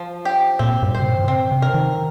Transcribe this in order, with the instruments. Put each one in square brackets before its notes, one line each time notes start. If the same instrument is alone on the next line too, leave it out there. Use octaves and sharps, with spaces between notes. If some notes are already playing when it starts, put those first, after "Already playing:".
Already playing: [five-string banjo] F3
G4
[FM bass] A#2 [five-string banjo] C4
[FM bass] G2
[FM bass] C3 [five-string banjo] C5
[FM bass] A#2
D#3
[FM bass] C3 [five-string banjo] C4
[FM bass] C3
[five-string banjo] A#4
[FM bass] D#3